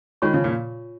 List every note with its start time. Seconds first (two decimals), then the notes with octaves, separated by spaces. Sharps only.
0.22 D#3 G#3 F4 C#5 G#5 C#6
0.34 C#3 F3
0.44 A#2